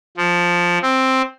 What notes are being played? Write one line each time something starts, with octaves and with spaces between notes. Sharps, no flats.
F3
C4